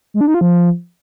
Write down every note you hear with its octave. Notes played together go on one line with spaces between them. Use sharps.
G#3
D4
D#4
F4
F3